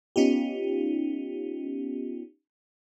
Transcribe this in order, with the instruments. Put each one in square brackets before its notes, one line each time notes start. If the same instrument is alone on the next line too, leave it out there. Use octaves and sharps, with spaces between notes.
[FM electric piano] B3 C#4 D#4 F4 G4